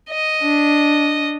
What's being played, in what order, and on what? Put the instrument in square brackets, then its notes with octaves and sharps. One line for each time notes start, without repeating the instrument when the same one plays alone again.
[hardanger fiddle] D#5
[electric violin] D4